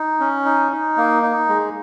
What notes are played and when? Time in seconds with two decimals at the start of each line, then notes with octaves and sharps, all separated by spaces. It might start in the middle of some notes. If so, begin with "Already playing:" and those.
Already playing: D#4
0.20 C#4
0.45 D#4
0.72 D#4
0.97 A#3
1.22 D#4
1.49 G#3